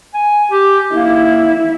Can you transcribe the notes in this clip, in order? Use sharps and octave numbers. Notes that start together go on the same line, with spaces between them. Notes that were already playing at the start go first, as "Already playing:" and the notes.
G#5
G4
A#3 E4